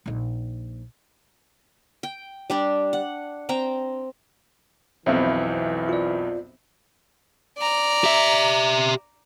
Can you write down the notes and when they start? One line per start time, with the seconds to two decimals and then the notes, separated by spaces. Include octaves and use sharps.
0.06 A#1 D#4
2.03 G5
2.50 G3 D4 G4
2.93 F#5
3.49 C4 G5 A#5
5.06 B1 F2 E3 B3 C4 E5
5.89 F4 D5
7.58 D5 A#5
8.04 G4 E5